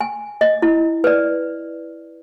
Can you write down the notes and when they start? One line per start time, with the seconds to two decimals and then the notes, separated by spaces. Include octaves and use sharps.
0.01 G#5
0.41 D#5
0.62 E4
1.04 B4 D5